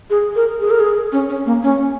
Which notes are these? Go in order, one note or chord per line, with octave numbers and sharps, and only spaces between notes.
G#4
A#4
G#4
A#4
G#4
C#4
C#4
A#3
C#4